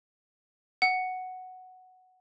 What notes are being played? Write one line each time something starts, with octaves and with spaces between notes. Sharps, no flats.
F#5